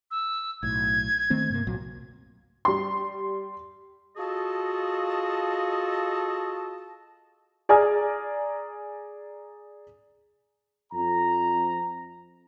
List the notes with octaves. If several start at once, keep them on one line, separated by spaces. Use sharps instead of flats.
E6
B1 A2 G#6
D#3 A3 C4
G2 C3 A#3
C2 A#2 F#3
G3 C6
F4 F#4 G#4 A4 D#5 A5
G#4 D5 G#5 A#5 D#6 F6
F2 A#5